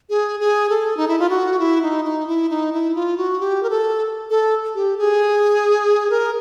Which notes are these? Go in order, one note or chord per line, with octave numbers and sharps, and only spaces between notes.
G#4
G#4
A4
D#4
E4
F4
F#4
E4
D#4
D#4
E4
D#4
E4
F4
F#4
G4
A#4
A4
A4
G4
G#4
A#4